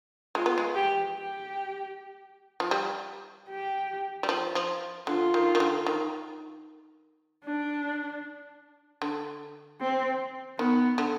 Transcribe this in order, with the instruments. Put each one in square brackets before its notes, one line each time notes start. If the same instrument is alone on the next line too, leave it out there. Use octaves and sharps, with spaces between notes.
[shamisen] G#3 [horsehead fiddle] F4
[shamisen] B3
G#3
[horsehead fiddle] G4
G4
[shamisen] F3
G3
[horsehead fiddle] G4
[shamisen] G3
F3
F3
[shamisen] D3 [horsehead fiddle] F4
[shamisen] D#3
D#3
D3
D#3
[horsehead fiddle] D4
[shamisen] D3
[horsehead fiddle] C4
[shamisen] D#3 [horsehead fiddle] B3
[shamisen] D3